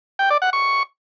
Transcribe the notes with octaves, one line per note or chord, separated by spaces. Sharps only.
G5
D5
F#5
C#6